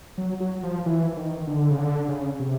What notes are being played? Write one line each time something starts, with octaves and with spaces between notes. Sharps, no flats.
F#3
F#3
F3
E3
D#3
D3
C#3
D3
C#3
C3